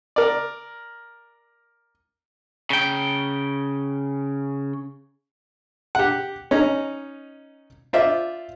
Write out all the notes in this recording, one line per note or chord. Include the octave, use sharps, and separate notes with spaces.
A#4 D5
C#3 G5
G4 F#5
C#4 D#4 A#5
F4 C5 D5 E5